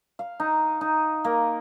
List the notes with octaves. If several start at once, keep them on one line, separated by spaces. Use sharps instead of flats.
F5
D#4
D#4
A#3